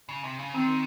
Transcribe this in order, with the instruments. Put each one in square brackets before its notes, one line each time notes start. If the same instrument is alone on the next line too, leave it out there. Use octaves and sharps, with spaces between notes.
[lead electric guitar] C#3
C3
C#3
[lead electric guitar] D#3 [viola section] C4